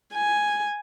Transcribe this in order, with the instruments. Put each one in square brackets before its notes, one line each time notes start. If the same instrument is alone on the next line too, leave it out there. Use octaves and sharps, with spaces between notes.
[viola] G#5